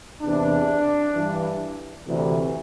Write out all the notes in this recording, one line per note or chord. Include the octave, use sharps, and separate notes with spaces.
E2 C3 E3 D4
G2 E3
D2 C3 E3